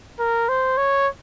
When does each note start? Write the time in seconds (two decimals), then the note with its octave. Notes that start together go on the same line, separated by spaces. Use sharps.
0.19 A#4
0.49 C5
0.77 C#5